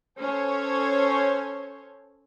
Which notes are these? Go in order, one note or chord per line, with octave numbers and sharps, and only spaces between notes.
C#4 A4 C5 C#5